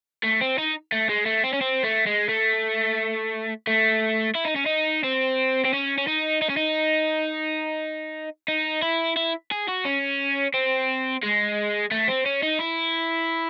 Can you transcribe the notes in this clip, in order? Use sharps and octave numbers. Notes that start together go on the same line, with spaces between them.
A3
C4
D#4
A3
G#3
A3
C4
C#4
C4
A3
G#3
A3
A3
E4
D#4
C#4
D#4
C4
C4
C#4
C#4
D#4
D#4
C#4
D#4
D#4
E4
E4
G#4
F#4
C#4
C4
G#3
A3
C4
C#4
D#4
E4